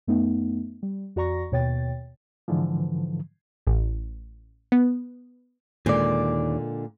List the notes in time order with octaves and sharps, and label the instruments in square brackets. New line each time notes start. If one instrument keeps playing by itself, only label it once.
[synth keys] F#2 A3 B3 D#4
G3
F2 F#4 D5 A#5 C#6 A#6
D#2 B2 C#5 G5 A6
[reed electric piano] G#2 D3 E3 F3
[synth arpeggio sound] A1
B3
[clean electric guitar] D#2 D5 [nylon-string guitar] A#2 D3 G#3